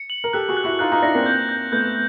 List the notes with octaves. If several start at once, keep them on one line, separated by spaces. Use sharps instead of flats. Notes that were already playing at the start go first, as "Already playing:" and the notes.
Already playing: C#7
F#7
A#4
G4 A4 F#6
F#4 G#4
F#6
E4 F#4
D#4 F4 F#6
D#4 F4
D4 E4 A#6
A#3 C4
G6
G6
A3 B3 G6